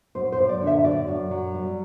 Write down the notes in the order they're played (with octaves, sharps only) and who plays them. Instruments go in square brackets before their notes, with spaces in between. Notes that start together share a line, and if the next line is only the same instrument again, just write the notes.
[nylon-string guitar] F#2 C5
C5
F#2
D5
D3
E5
F#2 D5
F#2
F#3
G3